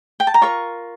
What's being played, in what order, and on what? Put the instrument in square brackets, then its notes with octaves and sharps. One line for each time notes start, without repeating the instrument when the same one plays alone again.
[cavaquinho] G5
A5
A#5
F4 A#4 C#5 C#6